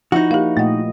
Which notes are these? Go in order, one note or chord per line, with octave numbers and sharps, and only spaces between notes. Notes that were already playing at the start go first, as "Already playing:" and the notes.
F3 D#4 E4 F#4
A#3 G4 F5
A#2 A3 D#5 F#5